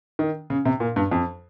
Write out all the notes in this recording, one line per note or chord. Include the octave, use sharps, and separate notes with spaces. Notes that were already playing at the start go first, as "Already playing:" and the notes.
D#3
C#3
C3
A#2
G2
F2